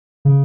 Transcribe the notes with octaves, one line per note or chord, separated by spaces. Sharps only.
C#3